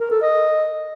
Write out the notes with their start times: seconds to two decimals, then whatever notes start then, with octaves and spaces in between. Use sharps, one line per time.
0.01 A#4
0.11 A4
0.22 D#5